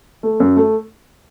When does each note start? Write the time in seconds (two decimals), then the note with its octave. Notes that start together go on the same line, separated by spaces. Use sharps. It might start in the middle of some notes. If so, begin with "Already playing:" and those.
0.23 A3
0.40 F#2
0.57 A3